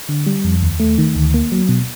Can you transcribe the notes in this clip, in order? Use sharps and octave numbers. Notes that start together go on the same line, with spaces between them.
D3
G3
F2
D#2
A3
D#3
D2
A#3
F#3
B2